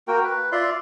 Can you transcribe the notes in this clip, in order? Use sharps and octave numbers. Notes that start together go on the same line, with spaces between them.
A#3 F#4 A#4 G5
B4
F4 D5 E5 C6